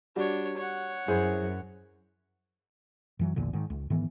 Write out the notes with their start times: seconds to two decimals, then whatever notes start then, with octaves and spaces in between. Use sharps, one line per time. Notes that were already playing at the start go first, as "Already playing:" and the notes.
0.16 G3 D4 F#4 C#5
0.57 C#5 F#5
1.08 F#2 E4 G#4 C5
3.19 F#2 E3 F#3
3.36 A#1 E2 A#2 D3
3.53 G#2 D#3
3.70 C#2
3.90 G#2 D#3 E3 B3